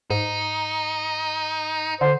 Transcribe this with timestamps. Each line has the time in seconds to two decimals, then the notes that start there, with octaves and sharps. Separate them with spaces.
0.10 G#2 D#4
2.01 D3 C5